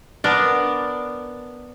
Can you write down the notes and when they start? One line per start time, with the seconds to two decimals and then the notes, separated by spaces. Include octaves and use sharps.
0.24 B3 D4 A#4 D5